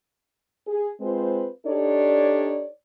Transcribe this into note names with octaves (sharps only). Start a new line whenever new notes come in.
G#4
G#3 C4 F4 B4 C5
D4 D#4 G4 A4 C#5 D5